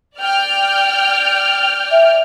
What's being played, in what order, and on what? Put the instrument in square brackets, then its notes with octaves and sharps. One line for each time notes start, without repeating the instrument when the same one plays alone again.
[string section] D5 G5 F6
[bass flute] E5